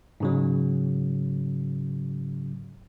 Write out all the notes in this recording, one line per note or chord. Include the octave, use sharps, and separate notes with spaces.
G#2 C#3 F#3